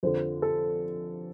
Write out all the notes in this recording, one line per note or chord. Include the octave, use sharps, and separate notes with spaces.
F2 D3 F3 C5
A4